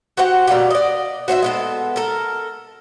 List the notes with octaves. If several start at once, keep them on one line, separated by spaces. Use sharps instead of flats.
F#4 G4 C5 F#5
B2 G3 A#3 G4
D5 D#5
F#4 C5 D5 E5
G#3 B3 A4
A4 A#4